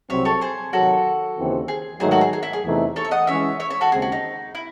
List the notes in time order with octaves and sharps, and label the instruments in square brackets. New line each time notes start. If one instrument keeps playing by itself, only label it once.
[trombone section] C2 C3 F#3 C4 [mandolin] C#5 E5
[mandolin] A4 C#5
G#4 C5
[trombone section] C3 D#3 F#3 [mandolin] F#4 A4
[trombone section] D#2 C#3 E3 C4
[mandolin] G#4
[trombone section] G#2 D#3 F#3 A3 D#4 [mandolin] G#4 C5
[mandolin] F#4 A4
G#4
G#4
E4
G#4
[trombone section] E2 C3 E3 A3 D#4
[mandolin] A4 C#5
E5
D#5 F#5
[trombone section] E3 G#3 C#4 [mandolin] C#5 E5
[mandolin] C#5 E5
C#5 E5
F#4 A4
[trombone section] D#2 C#3 G#3 C4 [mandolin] G#4
[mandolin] F#4
D#4
E4